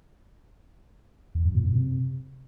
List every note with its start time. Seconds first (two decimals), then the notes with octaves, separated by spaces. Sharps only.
1.35 E2
1.45 F#2
1.55 A#2
1.65 F#2
1.75 C3